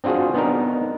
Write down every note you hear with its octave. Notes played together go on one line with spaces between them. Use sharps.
C4 D4 F4 F#4 G#4
B3 D4 D#4 A#4